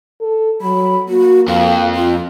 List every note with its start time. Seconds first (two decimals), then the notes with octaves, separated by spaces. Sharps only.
0.21 A4
0.61 F#3 B5
1.09 A#3 F#4
1.48 F2 F5
1.95 F4